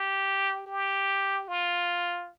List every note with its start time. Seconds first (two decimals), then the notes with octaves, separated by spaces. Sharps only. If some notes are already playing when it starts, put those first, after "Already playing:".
Already playing: G4
0.67 G4
1.48 F4